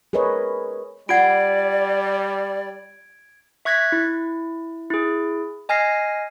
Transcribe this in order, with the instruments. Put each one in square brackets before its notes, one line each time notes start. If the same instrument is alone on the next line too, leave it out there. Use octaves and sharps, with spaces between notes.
[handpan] G#4 A#4 B4 C#5 D#5
[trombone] G3 [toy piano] F4 F#5 [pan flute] D5 [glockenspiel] G#6 D7
[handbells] E5 C#6 F#6 G#6 A#6 B6
E4
E4 G#4
D#5 G#5 F6 A#6 C7